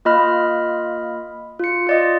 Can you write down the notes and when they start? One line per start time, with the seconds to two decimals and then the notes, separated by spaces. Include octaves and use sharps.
0.05 A#3 F4 D#5 B5 F6
1.59 F4 C#7
1.87 F4 D5 D#5